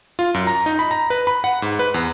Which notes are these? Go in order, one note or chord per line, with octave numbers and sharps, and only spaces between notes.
F4
F#2
A#5
D#4
B5
A#5
B4
B5
F#5
G#2
B4
E2